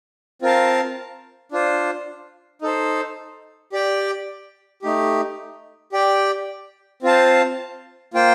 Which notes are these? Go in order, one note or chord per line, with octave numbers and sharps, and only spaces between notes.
C4 F4 A#4 F5 A5
D4 F4 C5
D#4 A4 C5
G4 D5 G5
A3 D#4 G4
G4 D5 G5
C4 F4 C5 F5 A5
A#3 F4 C5 G5